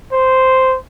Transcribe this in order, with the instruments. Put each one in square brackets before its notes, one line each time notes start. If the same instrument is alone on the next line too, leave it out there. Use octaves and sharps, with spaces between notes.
[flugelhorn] C5